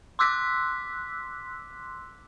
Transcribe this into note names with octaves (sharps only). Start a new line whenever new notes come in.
C6 D6 E6 F#6 B6